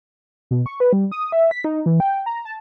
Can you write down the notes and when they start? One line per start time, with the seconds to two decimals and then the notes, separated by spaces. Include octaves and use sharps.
0.51 B2
0.66 C#6
0.80 B4
0.93 G3
1.12 D#6
1.32 E5
1.51 B6
1.64 D#4
1.86 E3
2.00 G5
2.26 A#5
2.45 A5